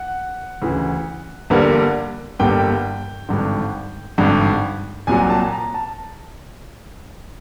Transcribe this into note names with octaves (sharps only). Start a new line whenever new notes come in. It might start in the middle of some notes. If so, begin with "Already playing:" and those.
Already playing: F#5
D2 C#3 E3
G1 G2 D3 G3 A#3
G1 G2 D3 G3 A#3 G5
G#1 G2 D3
G#1 G2 D3
C2 A#2 F#3 G#5
A5
A#5
A5